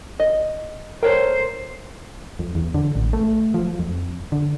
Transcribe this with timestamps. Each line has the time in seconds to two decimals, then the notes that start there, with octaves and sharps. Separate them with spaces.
0.20 D#5
1.03 A4 A#4 C5 C#5 G5
2.39 F2
2.55 E2
2.74 D3
2.95 A1
3.13 A3
3.54 F3
3.79 F2
4.32 D3